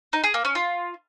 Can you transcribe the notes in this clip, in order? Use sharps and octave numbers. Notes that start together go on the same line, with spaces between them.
D#4
G#4
A#3
C#4
F4